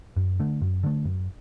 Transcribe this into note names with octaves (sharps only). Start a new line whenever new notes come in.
F#2
D3 A3
F#2
D3 A3
F#2